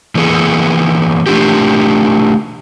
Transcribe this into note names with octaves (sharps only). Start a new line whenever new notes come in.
E3 A#3 B3 G#4 A4
A3 D4 F4 G4